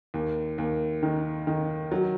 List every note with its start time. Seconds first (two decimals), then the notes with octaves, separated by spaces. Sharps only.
0.14 D#2
0.58 D#2
1.03 D#3
1.47 D#3
1.92 F#3